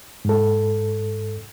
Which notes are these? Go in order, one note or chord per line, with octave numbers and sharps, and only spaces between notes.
G#2 A4